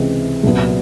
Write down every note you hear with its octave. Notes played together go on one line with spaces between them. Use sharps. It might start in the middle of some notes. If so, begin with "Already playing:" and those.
Already playing: C#2 C3 E3 G#3 C4
C2 A#2 F#3 B3